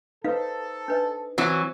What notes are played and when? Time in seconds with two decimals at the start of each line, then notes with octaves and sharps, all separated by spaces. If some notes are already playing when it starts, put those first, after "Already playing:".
0.24 D#4 A4 B4 C5 F5
0.88 D4 B4 D#5
1.38 E3 F#3 C4 F4 F#4